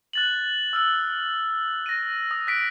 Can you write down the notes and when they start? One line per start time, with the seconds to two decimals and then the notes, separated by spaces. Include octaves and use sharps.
0.13 F#6 A6 F#7
0.73 E6 F6 F#7
1.86 A#6 D#7
2.31 D#6
2.47 F#6 B6 D7